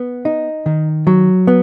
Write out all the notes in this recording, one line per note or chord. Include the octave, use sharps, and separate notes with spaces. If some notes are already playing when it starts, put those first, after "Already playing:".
Already playing: B3
D#4
D#3
F#3
B3